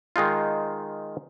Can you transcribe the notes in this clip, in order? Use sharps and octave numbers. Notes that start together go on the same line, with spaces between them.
D#3 G#3 D#4 F4